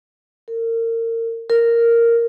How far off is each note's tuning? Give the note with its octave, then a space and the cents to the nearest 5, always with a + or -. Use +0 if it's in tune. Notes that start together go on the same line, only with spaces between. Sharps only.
A#4 -30
A#4 -5